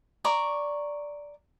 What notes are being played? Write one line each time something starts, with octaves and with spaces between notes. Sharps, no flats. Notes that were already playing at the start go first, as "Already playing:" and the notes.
D5 A#5 C#6